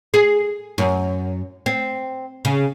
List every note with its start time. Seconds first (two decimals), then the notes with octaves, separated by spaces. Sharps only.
0.14 G#4
0.78 F#2
1.66 C4
2.45 C#3